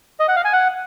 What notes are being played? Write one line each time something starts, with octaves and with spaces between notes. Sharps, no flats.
D#5
F#5
F5
G#5
F#5